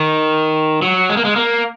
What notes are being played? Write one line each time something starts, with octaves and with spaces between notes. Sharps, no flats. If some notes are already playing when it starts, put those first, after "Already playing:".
Already playing: D#3
F#3
G#3
A#3
G#3
A#3